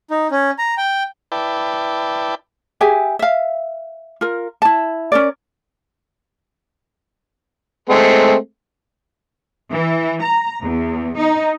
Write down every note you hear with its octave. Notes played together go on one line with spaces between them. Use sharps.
D#4
C#4
A#5
G5
E4 B4 D5 G5 A5
G4 G#4 E5 G#5
E5 F5
F4 A#4
E4 A5
C#4 A#4 D5
G#3 A3 C4
E3
A#5
E2
D#4